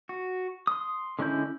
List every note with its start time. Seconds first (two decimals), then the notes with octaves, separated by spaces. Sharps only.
0.09 F#4
0.67 C6 D#6
1.19 D3 G#3 C#4 E4 G6